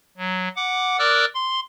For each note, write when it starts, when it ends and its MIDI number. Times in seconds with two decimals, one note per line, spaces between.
0.17 0.48 54
0.56 0.99 78
0.56 0.99 86
0.99 1.25 70
0.99 1.25 74
0.99 1.25 86
0.99 1.25 88
0.99 1.25 90
1.35 1.60 84